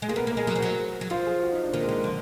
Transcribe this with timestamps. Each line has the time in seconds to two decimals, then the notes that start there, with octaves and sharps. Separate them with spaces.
0.02 G#3
0.09 A#3 G#4
0.16 B3 A#4
0.27 A#3
0.32 A#4
0.37 G#3
0.47 F#3 G#4
0.56 F3
0.58 F#3 F#4
0.68 G#4
1.01 F#3
1.10 F3 F4
1.26 G#4
1.42 F#4
1.52 D#4
1.63 D4
1.73 D#3 A#3
1.83 G#3
1.89 D#3
1.95 G#3
2.04 D3 F3